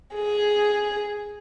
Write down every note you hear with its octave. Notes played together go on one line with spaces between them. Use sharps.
G#4